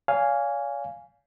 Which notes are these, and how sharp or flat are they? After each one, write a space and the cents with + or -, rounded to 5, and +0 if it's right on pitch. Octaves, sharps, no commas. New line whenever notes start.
C#5 +45 F5 +0 G#5 -5